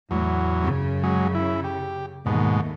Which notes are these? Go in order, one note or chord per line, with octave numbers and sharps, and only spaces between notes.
E2 A2 F#3
F#2 C#3
F#3 G#3
E4
G4
D#2 G#2 B2 A3